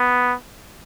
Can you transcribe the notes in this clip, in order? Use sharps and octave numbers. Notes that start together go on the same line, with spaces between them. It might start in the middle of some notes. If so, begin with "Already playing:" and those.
Already playing: B3